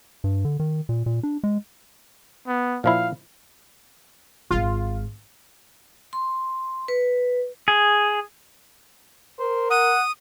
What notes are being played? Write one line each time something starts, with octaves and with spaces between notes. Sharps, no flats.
G2
D3
D#3
A#2
A#2
D4
G#3
B3
A#2 F3 E4 F5
D#1 G#1 F4
C6
B4
G#4
A#4 C5
F#5 D#6